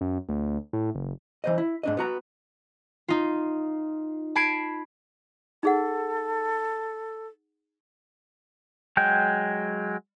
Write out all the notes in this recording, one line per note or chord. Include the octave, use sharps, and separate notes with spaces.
F#2
D2
A2
F#1
E3 C5 D#5
E4
G#2 D4 D#5
B3 F#4 A#5
D#4 F4
A5 B5 G#6 C7 D7
D#4 G#4 A4 F#5
F#3 G#3 G5